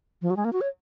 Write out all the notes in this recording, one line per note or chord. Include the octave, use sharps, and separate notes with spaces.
F3
F#3
G#3
A#3
F#4
C#5